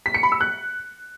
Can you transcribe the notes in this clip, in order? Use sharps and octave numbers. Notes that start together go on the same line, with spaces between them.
B6
C#7
B5
E6
F#6